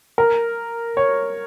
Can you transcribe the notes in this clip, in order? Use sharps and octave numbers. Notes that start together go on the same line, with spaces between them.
A#4
C#5